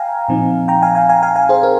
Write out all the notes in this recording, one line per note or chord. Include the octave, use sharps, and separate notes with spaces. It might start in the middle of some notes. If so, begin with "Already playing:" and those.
Already playing: F5 G5 G#5 A#5
A#2 F3 C4 D#4
G5 A#5
F5 G#5
F5 G#5
F5 G#5
F5 G#5
F5 G#5
G#4 C5
A#4